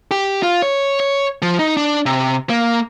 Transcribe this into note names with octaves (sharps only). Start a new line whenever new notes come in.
G4
F4
C#5
C#5
F3
D#4
D4
C3
A#3